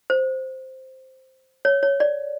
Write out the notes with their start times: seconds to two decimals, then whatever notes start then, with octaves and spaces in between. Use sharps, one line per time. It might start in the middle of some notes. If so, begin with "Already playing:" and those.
0.10 C5
1.65 C#5
1.83 C#5
2.00 D5